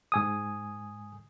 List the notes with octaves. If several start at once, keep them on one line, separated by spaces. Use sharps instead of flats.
G#2 G#5 D#6